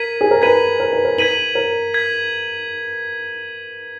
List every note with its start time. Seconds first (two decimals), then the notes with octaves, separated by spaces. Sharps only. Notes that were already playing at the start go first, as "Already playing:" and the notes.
Already playing: A#4 G#6 B6 D#7 F#7
0.21 G#4
0.31 A#4
0.42 B4 G#6 B6 D#7 F#7
0.80 A#4
0.93 B4
1.05 A#4
1.18 B4 G#6 B6 D#7 F#7
1.55 A#4
1.94 G#6 B6